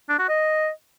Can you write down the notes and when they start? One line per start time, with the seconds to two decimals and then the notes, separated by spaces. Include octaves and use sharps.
0.09 D4
0.19 F#4
0.28 D#5